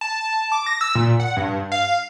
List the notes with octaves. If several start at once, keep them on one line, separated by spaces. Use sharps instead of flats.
A5
A5
D6
A#6
E6
A#2
F#5
G2
F5